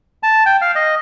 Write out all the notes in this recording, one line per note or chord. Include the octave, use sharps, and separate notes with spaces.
A5
G5
F5
D#5